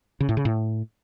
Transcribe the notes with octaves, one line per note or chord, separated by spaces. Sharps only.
C#3
A2
C#3
A2